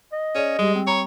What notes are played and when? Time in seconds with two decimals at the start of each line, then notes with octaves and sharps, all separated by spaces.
0.12 D#5
0.35 C#4 G#4 D5
0.59 G3 G#3 G4
0.75 C4
0.87 C#5 A#5 B5